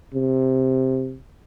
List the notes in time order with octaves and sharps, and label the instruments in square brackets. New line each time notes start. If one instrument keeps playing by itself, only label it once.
[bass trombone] C3